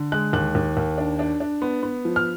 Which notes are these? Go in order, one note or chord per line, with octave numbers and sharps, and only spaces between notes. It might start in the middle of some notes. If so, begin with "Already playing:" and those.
Already playing: D3
G#3 F#6
D#2 F#6
D#2
D#2
D4
D4
D4
B3
B3
F3
F6